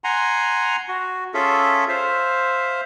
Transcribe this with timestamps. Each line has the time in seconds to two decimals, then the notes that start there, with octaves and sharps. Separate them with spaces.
0.04 F#5 G#5 A#5 C6
0.88 F#4
1.34 C#4 F4 G#4 A4 E5
1.89 C5 E5 F5